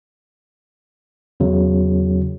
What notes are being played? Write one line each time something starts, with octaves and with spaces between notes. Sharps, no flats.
E2 C#3 F#3